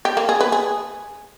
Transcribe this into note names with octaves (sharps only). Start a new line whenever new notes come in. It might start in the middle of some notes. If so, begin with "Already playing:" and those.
G4
A#3
G#4
B4
G#4